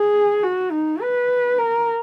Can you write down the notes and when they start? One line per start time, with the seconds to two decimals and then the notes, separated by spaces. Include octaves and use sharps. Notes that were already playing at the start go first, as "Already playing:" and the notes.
Already playing: G#4
0.43 F#4
0.71 D#4
1.01 B4
1.59 A#4